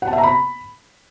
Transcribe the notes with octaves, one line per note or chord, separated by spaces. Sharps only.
F#5
A5
E5
A#5
B5